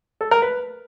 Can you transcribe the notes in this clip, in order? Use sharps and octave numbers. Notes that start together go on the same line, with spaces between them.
A4
A#4
B4